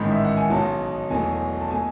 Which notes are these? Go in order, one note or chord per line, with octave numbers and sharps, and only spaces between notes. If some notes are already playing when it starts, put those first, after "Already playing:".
Already playing: A1 G#2 D#3 G#3 B5
E5
F#5
G#5
B1 B2 F#3 A5
E1 E2 B2 F#3 A3 G#5
A5
B2 A3 G#5